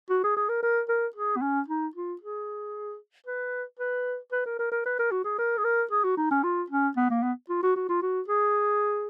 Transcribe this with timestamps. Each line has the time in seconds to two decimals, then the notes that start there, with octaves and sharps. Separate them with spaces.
0.10 F#4
0.24 G#4
0.37 G#4
0.49 A#4
0.63 A#4
0.89 A#4
1.16 G#4
1.37 B3
1.42 C#4
1.68 D#4
1.96 F4
2.21 G#4
3.27 B4
3.79 B4
4.32 B4
4.46 A#4
4.59 A#4
4.72 A#4
4.85 B4
4.99 A#4
5.11 F#4
5.25 G#4
5.38 A#4
5.58 G#4
5.64 A#4
5.91 G#4
6.04 F#4
6.17 D#4
6.31 C#4
6.44 F4
6.70 C#4
6.97 B3
7.10 A#3
7.23 B3
7.49 F4
7.63 F#4
7.76 F#4
7.89 F4
8.02 F#4
8.28 G#4